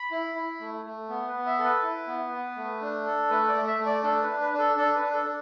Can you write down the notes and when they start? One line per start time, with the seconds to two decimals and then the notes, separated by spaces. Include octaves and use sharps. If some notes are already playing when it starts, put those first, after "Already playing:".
Already playing: B5
0.11 E4
0.36 E4
0.61 A3
0.85 A3
1.09 B3
1.28 B4
1.34 B3
1.46 E5
1.59 A4
1.64 B4
1.83 E4
2.07 B3
2.33 B3
2.56 A3
2.81 D4
3.06 A4
3.30 A3 B4
3.49 D5
3.55 A3
3.67 E5
3.79 A3
3.86 D5
4.04 D4 A4
4.22 B4
4.29 D4
4.41 B4
4.53 D4
4.59 A4
4.77 D4 A4
4.95 B4
5.02 D4
5.14 A4
5.26 D4